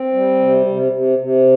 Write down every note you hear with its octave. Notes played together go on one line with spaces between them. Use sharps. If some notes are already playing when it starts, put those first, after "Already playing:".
Already playing: C4
G3
C3
C3
C3
C3